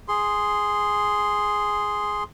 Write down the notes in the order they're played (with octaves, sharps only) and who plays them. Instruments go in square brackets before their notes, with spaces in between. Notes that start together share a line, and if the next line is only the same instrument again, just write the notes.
[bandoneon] G#4 C6